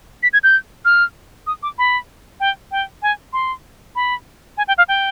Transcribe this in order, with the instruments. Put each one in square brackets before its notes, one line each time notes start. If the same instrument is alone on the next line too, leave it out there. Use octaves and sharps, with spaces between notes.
[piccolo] B6
G#6
G6
F6
D#6
D6
B5
G5
G5
G#5
C6
B5
G#5
G5
F5
G5